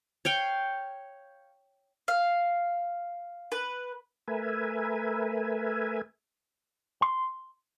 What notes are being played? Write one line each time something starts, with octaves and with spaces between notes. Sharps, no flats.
C#5 F5 G5
F5
B4
A3 A#4 B4 E5 G#5
C6